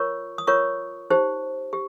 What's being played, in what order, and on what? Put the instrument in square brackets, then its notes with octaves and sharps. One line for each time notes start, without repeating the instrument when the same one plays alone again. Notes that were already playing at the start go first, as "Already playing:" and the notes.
Already playing: [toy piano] F4 A#4 C#5 C#6
D#6
F4 A#4 C#5 C#6
D#4 G4 C5
G4